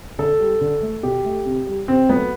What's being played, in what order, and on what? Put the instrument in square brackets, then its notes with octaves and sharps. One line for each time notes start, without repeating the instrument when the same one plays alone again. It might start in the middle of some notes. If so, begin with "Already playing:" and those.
[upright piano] D3 A4
G3
D3
A3
B2 G4
A3
C3
G3
C3 C4
F#3 A3 B3